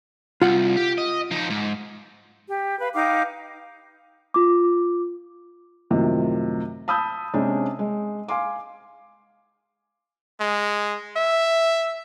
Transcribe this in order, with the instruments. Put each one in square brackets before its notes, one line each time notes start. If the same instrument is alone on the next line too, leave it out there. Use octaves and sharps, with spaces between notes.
[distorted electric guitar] C2 [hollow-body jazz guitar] F4 F#5
[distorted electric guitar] G4
D#5
F3 D#4
G#2
[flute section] G4
B4 F5
D#4 F5 G5 D6
[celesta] F4 D6
[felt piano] F#2 A2 C3 D#3 F3
A5 B5 D#6 E6 G6
C3 G#3 C#4 D4
G#3
F5 G#5 C6 D6
[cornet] G#3
E5